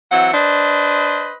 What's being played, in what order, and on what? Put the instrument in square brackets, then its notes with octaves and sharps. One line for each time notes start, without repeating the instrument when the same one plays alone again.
[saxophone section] E3 F#3 C4 [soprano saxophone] F#5
[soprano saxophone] D4 [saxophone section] B4 C5 D#5